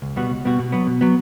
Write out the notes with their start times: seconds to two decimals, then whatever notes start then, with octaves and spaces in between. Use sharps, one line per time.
0.02 C#2
0.16 B2 G3 B3 F#4
0.30 C#2
0.45 B2 G3 B3 F#4
0.59 B2
0.72 F#3 B3
0.87 B2
1.01 F#3 B3